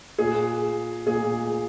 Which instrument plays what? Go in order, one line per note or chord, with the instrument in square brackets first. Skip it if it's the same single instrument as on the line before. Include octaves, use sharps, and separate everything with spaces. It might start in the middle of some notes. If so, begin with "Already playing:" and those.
[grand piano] A#2 G#4
A#2 G#4